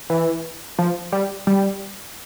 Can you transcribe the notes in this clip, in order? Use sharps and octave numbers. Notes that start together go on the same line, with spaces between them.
E3
F3
G3
G3